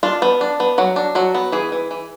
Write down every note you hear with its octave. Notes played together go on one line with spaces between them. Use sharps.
D4 F4
B3
D4
B3
F#3 F#4
D4
F#3 F#4
B3
E3 G#4
E3
E3